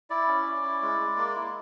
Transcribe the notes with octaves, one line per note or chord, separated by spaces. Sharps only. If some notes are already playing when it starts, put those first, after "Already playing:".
E4 D5
C#4
C#4
E4
G#3
G#3
A#3
E4